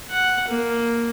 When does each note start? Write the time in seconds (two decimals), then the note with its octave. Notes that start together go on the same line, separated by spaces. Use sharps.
0.11 F#5
0.48 A#3